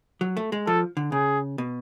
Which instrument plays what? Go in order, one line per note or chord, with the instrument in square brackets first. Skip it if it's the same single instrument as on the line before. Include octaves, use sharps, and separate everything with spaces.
[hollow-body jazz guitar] F#3
A3
G#3
[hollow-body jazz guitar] F3 [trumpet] A4
[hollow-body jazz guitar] D3
[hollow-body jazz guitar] C#3 [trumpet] G#4
[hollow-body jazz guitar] B2